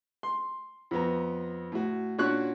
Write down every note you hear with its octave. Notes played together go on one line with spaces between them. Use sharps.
C6
F2 B3 A#5
A2 F#4
A#2 C#4 D4 F#4 C#6 F#6